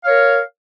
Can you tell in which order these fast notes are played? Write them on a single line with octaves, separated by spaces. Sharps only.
F5 C#5 A#4